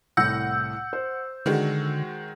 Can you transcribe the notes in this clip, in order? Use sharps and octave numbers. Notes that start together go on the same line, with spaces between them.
C2 A2 F#5 E6 G6
C5
D3 D#3 G#3 F#4